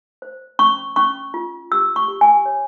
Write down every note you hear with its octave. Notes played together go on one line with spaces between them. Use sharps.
C5
C#4 C#6
C#4 C#6
F4
G4 E6
C#6
G4
G#5
C#5